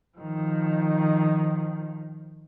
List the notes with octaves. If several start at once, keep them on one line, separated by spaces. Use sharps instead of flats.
D#3 F3